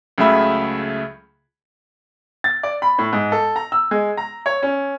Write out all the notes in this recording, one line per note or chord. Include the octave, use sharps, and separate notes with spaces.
C#2 C#3 F#3 A3 E5 B5
A6
D5
B5
A2
G#2
A4
A#5
E6
G#3
A#5
C#5
C#4